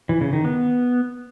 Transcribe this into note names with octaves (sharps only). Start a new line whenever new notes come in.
E3
C#3
D#3
B3